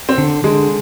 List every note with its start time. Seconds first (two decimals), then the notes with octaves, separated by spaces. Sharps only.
0.09 C4
0.18 D3
0.44 D3 G#3